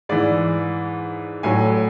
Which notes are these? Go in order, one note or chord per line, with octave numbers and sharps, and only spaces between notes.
G#2 E3 D5
A2 F#3 G#5